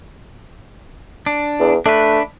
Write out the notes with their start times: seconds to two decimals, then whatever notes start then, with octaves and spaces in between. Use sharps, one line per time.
1.26 D4
1.60 E2
1.86 A3 D4 B4